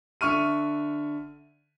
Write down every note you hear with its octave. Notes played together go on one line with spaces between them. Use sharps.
D3 E5 C#6 F6 D#7